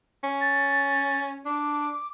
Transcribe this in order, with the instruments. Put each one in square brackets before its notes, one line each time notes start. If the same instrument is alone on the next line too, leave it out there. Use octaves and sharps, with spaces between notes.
[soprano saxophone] C#4
[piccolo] A6
[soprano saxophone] D4 [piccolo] D6